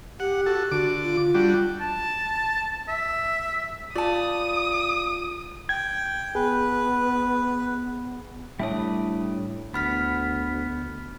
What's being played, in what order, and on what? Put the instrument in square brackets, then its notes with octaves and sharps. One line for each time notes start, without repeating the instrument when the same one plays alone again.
[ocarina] G4 [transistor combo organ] F#5
[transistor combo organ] F#4 A4
[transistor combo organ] D3 D6 [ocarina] F#4
[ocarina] F4
[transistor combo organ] G3 D4 F#4
[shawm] A5
E5
[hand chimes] F4 [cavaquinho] D5 A5 [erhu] D#6
[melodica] G5 [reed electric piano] G#6
[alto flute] B3 [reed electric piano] G#4 [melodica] B4
[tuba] A2 [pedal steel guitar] G3 D4 D#6 [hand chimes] C#5 E5
[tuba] D2 [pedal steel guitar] B3 [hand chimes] B5 F6 B6